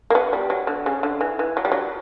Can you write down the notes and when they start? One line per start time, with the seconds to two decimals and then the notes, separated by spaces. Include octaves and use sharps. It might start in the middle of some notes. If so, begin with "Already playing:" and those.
0.10 A#3
0.15 B3
0.33 G3
0.50 F#3
0.67 D3
0.86 C#3
1.03 D3
1.21 E3
1.39 E3
1.57 F#3
1.65 G3
1.72 F#3